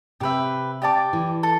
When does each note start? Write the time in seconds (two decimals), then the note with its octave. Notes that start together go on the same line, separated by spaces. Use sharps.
0.20 C3 G4 B4 E5
0.82 G4 D5 A5 D6
1.13 E3
1.43 A4